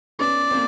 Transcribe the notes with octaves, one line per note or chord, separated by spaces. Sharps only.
B3 C#4 D5
A#3 C4